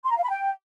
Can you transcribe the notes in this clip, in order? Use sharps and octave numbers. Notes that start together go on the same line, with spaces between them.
C6
A#5
F5
B5
G5